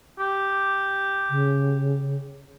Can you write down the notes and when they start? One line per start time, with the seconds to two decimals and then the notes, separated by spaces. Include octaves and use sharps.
0.19 G4
1.30 C#3